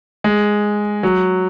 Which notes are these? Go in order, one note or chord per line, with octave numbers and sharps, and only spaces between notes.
G#3
F#3